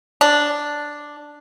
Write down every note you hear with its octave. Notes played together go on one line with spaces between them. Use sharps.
D4